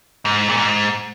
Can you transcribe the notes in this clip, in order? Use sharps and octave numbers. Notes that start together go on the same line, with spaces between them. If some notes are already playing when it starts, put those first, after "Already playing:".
G#2
A#2
G#2